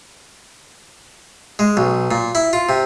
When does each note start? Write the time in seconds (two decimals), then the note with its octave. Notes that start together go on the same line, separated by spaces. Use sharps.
1.59 G#3
1.77 B1
2.11 A#2
2.35 E4
2.53 F4
2.69 C3